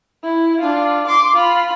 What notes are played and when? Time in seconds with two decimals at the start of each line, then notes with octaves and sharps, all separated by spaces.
0.23 E4
0.60 D4 F4
1.07 C6 D6
1.35 F4 B5